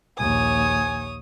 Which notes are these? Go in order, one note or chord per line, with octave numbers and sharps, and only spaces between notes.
A#1 D#2 C#5 G#5 D#6